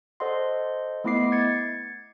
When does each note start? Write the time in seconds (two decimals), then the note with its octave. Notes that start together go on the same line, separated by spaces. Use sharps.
0.20 A4 C5 D5 D#5 F#5 C6
1.04 A3 B3 E4 D#5 D6 C7
1.32 G#6 A6 C#7